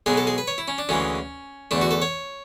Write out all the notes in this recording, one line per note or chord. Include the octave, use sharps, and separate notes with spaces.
B1 B2 G#3 B3 G#4
A4
G#4
B4
C#5
E4
C#4
D4
D2 C#3 E3 G#3 C#4
E2 D3 A3 D4
F#4
A4
C#5